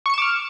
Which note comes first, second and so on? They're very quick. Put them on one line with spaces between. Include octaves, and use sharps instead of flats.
C#6 C#7 E7 D6 F6